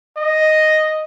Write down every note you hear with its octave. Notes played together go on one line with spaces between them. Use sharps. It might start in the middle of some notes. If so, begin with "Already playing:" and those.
D#5